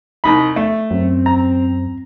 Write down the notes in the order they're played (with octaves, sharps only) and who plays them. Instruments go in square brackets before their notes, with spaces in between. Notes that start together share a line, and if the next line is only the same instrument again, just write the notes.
[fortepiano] C2 D#4 B5
A3
[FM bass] F#2 [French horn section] C4
[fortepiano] A#5